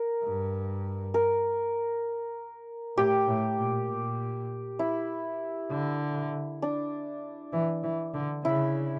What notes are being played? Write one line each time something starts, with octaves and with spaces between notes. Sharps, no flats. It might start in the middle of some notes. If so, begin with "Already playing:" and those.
Already playing: A#4
G2
A#4
A2 G4
A2
A#2
A#2
E4
D3
D4
E3
E3
D3
C#3 E4